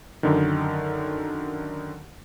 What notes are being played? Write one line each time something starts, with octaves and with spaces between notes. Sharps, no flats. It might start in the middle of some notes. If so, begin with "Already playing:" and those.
F#2 D3 D#3